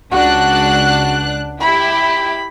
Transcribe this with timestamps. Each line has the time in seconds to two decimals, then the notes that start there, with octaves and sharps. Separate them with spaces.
0.11 C#2 D4 F#4 F#6
1.60 E4 G4 B5